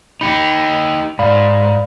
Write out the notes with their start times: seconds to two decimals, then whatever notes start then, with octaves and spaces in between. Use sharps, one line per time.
0.21 D#4 G4 B5 C#7
1.19 G#2 D5 F5 B5